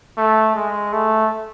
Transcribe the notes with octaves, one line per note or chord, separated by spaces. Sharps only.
A3
G#3
A3